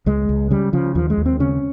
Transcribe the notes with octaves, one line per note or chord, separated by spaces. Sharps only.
C#2 G#3
C#2
C#3 G3
C#3 F3
D#2 F3
G#3
D#2
C4
C#3 C#4